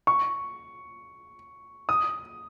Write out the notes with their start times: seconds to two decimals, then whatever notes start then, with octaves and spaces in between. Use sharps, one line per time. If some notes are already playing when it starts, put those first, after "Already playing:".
0.07 C#6
1.89 D#6